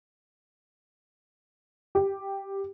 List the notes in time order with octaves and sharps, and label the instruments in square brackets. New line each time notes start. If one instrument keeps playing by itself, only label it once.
[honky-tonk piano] G4